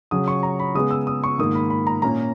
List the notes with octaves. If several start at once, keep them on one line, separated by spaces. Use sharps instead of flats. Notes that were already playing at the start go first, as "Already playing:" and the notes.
C#3 F#3 C#4 D#6
C#6
A#5
B5
C#3 G#3 B3 D#6
E6
D#6
C#6
G#2 D#3 A#3 D#6
B5
B5
A#5
A#2 A#3 C#4 A#5